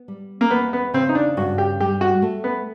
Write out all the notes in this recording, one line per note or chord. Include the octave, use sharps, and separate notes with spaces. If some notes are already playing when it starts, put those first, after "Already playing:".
Already playing: B3
G3
A#3
E2 B3
B3
C#3 C4
D#4
D4
G2 F#4
G4
G3 G4
F#4
A3
B3